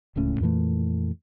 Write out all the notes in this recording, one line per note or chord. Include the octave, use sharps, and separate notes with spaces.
D1 C#2 A2 C#4
F2 A#2 E3 A3